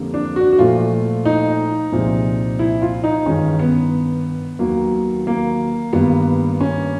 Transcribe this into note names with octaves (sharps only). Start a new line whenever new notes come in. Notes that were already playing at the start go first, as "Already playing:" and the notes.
Already playing: F2 D3 G3 A#3
D4
F#4
F#4
A#2 F3 A3 F4
D#4
C2 A#2 F3 G#3
E4
F4
D#4
G2 D#3 G#3 C#4
B3
D#2 D#3 F#3 A#3
A#3
G2 D#3 G3 A#3 B3
C#4